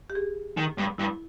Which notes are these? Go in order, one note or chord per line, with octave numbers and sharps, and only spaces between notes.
G4
G#4
D#3
G2
G2 E4